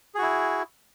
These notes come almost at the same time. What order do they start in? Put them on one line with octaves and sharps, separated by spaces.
G#4 F#4 E4